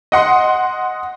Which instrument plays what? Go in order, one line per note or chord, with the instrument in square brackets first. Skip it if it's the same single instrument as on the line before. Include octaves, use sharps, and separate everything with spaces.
[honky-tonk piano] D#5 F#5 C6